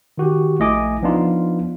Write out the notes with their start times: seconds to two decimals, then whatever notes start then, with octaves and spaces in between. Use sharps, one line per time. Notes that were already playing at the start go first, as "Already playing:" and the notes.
0.18 D#3 F#4 G4
0.59 A#1 A3 E4 D#5 G#5 D6
1.02 F3 B3 D4 D#4 F4